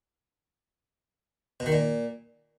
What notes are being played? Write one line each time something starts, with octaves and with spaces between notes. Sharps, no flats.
B2
D#3
A#2